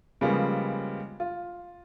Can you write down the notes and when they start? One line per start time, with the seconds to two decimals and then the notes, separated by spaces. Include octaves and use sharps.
0.21 C#3 F3 G3 G#3 A#3 B3
1.20 F4